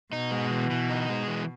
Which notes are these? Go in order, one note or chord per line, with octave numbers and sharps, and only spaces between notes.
B2 D#4
G#3
E3
E3
D#4
G#3
E3